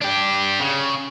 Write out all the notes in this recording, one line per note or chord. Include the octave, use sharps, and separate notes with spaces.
D4 G4
C#3